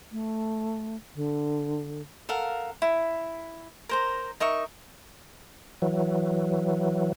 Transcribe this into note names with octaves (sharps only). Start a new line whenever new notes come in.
A3
D3
A4 A#4 F5 F#5
E4
A#4 C5 A#5
D#4 A#4 E5 C#6
E3 F#3